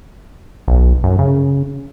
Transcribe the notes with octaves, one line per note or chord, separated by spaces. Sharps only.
B1
F#2
C#3